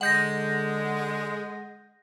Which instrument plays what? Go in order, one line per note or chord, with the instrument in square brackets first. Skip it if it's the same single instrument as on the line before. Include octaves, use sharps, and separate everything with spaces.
[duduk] D3 [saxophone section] G#3 [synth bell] F#5 G6 A#6